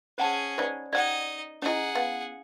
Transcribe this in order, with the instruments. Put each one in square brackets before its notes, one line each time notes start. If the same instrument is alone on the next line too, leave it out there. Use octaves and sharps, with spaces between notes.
[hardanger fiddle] C#4 G#4 [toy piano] C5 F#5 A5
[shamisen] D#4 B4 [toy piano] C5 D5
[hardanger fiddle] D#4 D#5 [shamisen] G4 F#5 [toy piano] D5
[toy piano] C#4 E4 [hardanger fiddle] G#4 F#5 [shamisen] D5 D#5
[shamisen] B3 [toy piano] F5